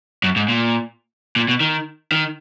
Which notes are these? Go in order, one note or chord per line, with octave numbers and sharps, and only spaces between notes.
F#2
G#2
A#2
A#2
B2
D#3
D#3